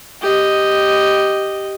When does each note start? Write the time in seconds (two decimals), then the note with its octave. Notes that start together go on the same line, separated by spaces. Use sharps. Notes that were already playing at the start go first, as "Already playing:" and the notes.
0.22 G4 D#5